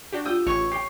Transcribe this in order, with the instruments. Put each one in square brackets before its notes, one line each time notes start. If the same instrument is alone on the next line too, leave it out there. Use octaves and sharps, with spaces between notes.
[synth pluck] D4 F#4 G4
[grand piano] F4 G4 E6 [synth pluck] G5 D#6 G6
[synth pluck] A1 [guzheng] C#5
[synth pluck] G4 [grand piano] G5 C7